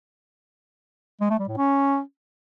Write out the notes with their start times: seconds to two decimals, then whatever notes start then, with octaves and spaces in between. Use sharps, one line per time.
1.21 G#3
1.30 A3
1.39 G3
1.48 A2
1.57 C#4